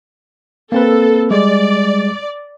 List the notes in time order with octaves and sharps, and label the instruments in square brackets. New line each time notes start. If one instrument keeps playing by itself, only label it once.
[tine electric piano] A#3 C4 B4 [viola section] A4
[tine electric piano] G3 G#3 [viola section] D5